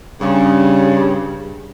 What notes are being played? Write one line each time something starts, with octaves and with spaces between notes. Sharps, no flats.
G2 C#3